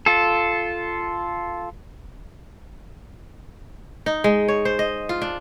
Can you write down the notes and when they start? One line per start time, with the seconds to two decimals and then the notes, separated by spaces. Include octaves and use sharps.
0.06 F4 A4
4.06 D#4
4.24 G#3
4.48 C#5
4.65 C5
4.79 D#5
5.09 F4
5.22 D4